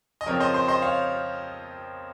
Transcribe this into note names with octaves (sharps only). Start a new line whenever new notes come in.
D#5
F2 C#3 F3 C4 F4 A#4 C#5
C5 D#5
C5
C5 D#5
C#5 F5